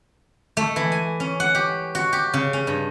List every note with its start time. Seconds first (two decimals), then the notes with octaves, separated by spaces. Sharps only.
0.57 A3
0.76 E3
0.92 G#5
1.20 C#4
1.40 F#5
1.55 G4
1.95 F#4
2.13 G4
2.33 C#3
2.53 C#4
2.67 G2